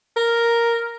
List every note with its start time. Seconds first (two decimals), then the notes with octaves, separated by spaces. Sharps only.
0.16 A#4